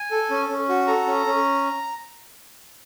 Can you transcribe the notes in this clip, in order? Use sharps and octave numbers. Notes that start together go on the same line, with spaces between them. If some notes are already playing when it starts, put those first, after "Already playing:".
Already playing: G#5
A4
C#4
C#4
F#4
A4 A#5
C#4
C#4